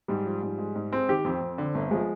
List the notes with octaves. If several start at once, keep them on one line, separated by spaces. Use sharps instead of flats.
G#2 G3
F3
G#2
G#3
G#2
G#3 C4
D#3 G4
F2 C4
F2
D3
G1
F3 G#3